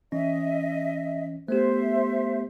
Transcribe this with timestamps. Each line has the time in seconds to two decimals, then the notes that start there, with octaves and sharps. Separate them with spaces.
0.12 E3 C#4 D#5 E5
1.48 A3 B3 G4 C5 E5